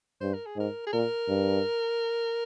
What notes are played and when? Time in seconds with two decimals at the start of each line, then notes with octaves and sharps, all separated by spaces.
0.21 G2 C5
0.34 A#4
0.46 G#4
0.56 G#2 A#4
0.87 G#4
0.93 A#2 A#4
1.28 G2